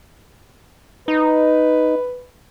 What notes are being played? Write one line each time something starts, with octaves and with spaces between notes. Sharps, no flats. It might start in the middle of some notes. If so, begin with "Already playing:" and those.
D#4 B4